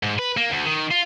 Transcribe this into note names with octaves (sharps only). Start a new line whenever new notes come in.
G#2
B4
A#3
D2
D#3
F4